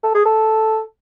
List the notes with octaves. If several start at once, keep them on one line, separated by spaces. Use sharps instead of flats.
A4
G#4
A4